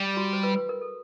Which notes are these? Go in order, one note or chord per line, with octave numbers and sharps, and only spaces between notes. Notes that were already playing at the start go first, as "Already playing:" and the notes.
Already playing: G3
F#4
C5
B4
B4
A#4
A4